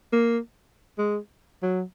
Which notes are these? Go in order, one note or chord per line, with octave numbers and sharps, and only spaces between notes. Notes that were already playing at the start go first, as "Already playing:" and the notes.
A#3
G#3
F#3